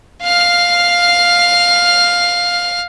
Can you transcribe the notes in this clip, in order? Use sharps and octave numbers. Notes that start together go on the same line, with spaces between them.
F5 F6